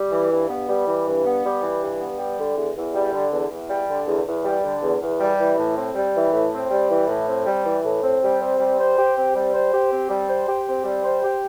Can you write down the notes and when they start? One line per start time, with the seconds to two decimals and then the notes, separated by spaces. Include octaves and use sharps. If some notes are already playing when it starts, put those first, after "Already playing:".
Already playing: G3
0.11 E3
0.30 G2
0.49 B3
0.68 G3
0.87 E3
1.06 G2
1.25 B3
1.44 G3
1.62 E3
1.81 G2
1.99 B3
2.19 G3
2.38 D3
2.56 E2
2.75 E2
2.94 G3
3.13 D3
3.32 E2
3.50 E2
3.69 G3
3.88 D3
4.07 E2
4.26 E2
4.45 G3
4.63 D3
4.82 E2
5.01 E2
5.20 G3
5.39 E3
5.57 A2
5.76 C4
5.95 G3
6.14 E3
6.33 A2
6.52 C4
6.71 G3
6.89 E3
7.08 A2
7.27 C4
7.46 G3
7.65 E3
7.84 A2
8.02 C4
8.21 G3
8.40 C4
8.59 G3
8.78 C5
8.97 G4
9.15 C4
9.35 G3
9.53 C5
9.72 G4
9.91 C4
10.09 G3
10.28 C5
10.47 G4
10.66 C4
10.85 G3
11.03 C5
11.22 G4